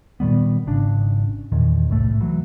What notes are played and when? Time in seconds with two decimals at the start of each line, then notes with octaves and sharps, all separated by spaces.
0.20 A#2 D#3 G3 B3
0.67 G#1 C#3 D4
1.52 E2 A#2 D#3
1.89 C2 A2 A3
2.20 E3 F#3